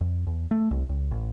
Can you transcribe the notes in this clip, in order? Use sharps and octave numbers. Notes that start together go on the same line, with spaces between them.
F2
E2
A3
C2
C#2
A1